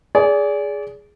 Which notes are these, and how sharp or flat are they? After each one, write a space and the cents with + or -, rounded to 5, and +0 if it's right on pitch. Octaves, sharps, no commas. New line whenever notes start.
G#4 +0 D5 -30